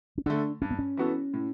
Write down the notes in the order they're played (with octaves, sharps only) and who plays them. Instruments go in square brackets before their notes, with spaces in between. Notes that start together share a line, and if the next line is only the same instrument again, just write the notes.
[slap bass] C#4
[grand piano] D3 A3 [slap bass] D4
[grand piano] G2 [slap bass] C#4
[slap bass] B3
C#4
[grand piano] E3 B3 F#4 A4
A2